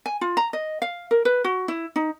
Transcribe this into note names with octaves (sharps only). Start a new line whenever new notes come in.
G#5
F4
A#5
D#5
F5
A#4
B4
F#4
E4
D#4